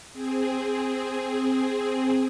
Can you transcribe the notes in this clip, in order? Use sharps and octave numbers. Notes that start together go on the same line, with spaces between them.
C4 G#4